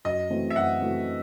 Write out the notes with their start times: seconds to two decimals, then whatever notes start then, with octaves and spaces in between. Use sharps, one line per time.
0.05 F#2 D#5
0.30 E3 A3 C4 F#4
0.50 E5
0.56 F#2 F#5
0.81 E3 A3 C4 F#4